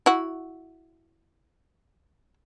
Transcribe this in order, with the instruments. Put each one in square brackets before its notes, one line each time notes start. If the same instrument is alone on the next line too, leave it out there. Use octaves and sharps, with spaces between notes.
[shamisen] E4 F#4